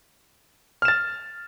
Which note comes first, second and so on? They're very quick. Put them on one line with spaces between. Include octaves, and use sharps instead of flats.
F6 E7 A6